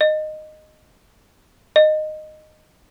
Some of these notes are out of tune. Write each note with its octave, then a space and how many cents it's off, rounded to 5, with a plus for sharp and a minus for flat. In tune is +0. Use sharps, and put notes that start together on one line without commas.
D#5 -15
D#5 -15